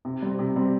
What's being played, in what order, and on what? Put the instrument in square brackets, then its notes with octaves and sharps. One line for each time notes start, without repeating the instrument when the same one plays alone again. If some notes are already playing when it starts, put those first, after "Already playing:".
[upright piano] C3
G3 C4
C3
G3 C4